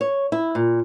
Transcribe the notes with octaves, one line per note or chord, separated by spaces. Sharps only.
C#5
E4
A#2